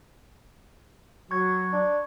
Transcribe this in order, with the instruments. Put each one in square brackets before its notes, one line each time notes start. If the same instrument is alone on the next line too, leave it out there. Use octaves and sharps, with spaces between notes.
[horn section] F#3 [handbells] C#6 G#6
[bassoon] D4